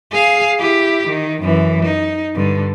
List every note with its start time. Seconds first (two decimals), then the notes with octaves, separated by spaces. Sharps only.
0.12 G#4 F5
0.59 E4 G4
1.08 D#3
1.42 F#2 E3
1.85 D#4
2.35 G2 D3